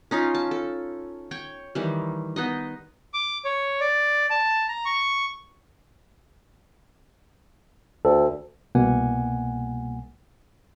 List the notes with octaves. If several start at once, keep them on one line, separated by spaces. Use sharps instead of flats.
C#4 D#4 F4 F5
A5
A4
C#5 G5
D#3 E3 G3
B3 D#4 D#5
D6
C#5
D5
A5
A#5
C#6
D2 A4
C2 B2 A#3 F#5 G#5